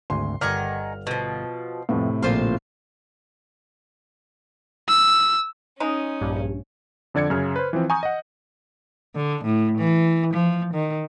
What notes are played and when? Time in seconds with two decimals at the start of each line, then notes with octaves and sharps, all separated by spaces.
0.10 G#1 D2 G#5 C6
0.41 G1 D#3 D5 F#5 G#5 F6
1.07 B2 F3
1.89 F2 A2 C3 B3
2.23 A#1 D3 A#3 F4 C5 F5
4.89 E6
5.80 G#3 C#4 D#4
6.21 A#1 G2
7.14 F2 D3 D5 G#6 C#7
7.30 F#2 C#3 F6
7.56 B4 C5
7.73 E3 F3 C4
7.90 G#5 A#5 C#6 D#6 G6
8.03 D#5 F#5
9.15 D3
9.45 A2
9.78 E3
10.34 F3
10.74 D#3